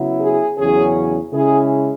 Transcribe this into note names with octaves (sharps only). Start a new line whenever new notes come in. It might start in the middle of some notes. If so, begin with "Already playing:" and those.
Already playing: C#3 F#3 B3 E4
G#4
E2 C#3 F#3 C#4 G#4
C#3 G#3 C#4 E4 G#4